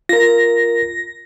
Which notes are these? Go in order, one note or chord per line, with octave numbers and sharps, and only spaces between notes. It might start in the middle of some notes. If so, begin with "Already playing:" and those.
F4 A#4 A#6